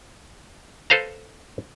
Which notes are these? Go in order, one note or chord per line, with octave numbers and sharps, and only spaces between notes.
A4 B4 C5 F5 A#5